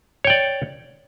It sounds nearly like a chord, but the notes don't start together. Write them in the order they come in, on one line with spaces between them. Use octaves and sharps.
C#5 G5 D5